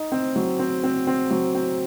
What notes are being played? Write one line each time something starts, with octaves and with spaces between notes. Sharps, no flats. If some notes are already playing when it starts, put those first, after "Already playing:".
Already playing: D#4
C4
F#3
C4
C4
C4
F#3
C4